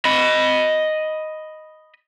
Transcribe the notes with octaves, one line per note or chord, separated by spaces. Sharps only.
D#5 B5